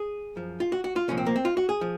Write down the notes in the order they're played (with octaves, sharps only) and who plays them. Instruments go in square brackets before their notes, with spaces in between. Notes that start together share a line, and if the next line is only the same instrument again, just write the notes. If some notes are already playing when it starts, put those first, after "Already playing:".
Already playing: [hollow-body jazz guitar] G#4
F#2 F3
F4
F#4
F#4
F4
C2 A#2 F3 C#4
C4
A#3
C4
F4
F#4
G#4
F3